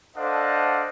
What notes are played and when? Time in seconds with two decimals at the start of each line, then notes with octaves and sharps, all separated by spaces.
0.16 D4 A4 C5 D#5 F5 F#5